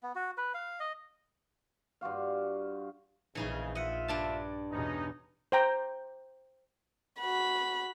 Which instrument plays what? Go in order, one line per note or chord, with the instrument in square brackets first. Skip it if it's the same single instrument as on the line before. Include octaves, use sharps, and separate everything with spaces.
[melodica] B3
F#4
B4
F5
D#5
[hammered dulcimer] G2 F4 F#4 F5
[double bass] A#1 [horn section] C#3 [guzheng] E3 D#4 G#4
[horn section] F4 E5 [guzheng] D#5 F#5
[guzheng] G2 D4 A5
[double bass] E2 B2 [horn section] B3 C#4 D#4
[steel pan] C5 G5 A#5
[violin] F#4 B5